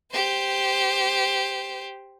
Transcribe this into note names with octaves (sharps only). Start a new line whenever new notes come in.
G4 C5